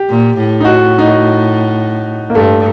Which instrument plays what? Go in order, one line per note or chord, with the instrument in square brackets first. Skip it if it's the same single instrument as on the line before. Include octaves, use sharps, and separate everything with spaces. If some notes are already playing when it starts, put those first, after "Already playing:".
Already playing: [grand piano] G4
[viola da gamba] A#2
A2
[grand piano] D#4
F#4
D#4
F#4
A#3
[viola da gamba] G2 [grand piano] A3